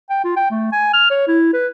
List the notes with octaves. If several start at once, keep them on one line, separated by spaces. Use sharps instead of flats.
G5
F4
G5
A3
G#5
F6
C#5
E4
B4